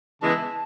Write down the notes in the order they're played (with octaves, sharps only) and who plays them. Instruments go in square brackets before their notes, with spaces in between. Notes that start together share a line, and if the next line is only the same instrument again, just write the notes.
[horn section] C#3 E3 G#3 B3 E4 [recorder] A5